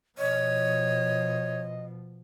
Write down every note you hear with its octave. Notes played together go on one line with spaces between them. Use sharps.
B2 F3 C#5 D#5